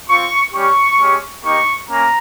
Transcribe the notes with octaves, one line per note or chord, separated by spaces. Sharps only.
C4 F4 C#6
G3 C#4 G4 C#6
G#3 C#4 G4
A#3 D#4 G4 C#6
A#3 C#4 A#5